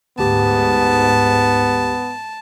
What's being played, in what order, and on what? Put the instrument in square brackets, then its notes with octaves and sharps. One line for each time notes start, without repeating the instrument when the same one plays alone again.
[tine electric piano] D2 G4 [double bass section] G#2 [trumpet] B3 [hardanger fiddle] A5